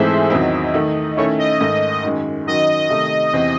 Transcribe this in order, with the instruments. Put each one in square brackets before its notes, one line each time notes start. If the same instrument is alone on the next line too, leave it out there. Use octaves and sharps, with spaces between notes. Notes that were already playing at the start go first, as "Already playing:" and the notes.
Already playing: [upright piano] G#2 E3 A3 C4 [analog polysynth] G#4 A4 C5 E5
[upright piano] E2 D#3 F#3 C4 E4 [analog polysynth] D#5
[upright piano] D#3 A3 D#4
[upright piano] D#3 A3 C#4 E4 [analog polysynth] C#5
[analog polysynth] D#5
[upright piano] G#2 D#3 A3 D#4
F#2 D#3 G#3
[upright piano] F#2 D#3 F#3 [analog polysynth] D#5
[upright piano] C3 D#3 A3 D#4
E2 C3 E3 C4